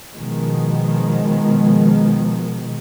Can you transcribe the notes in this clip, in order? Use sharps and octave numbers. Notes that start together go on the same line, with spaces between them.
B2 D#3 F3 G#3